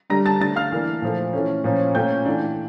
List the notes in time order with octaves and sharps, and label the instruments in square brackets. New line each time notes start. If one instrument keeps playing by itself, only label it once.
[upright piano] D3 G3 D4 A#5 A#6
A5 A6
D3 A3 D4 A5 A6
F5 F6
E3 A#3 D4
A#2 F3 A3
E3 A3 C#4
A#2 F3 C#4
A#2 A3 C#4 G5 G6
E3 A3 D4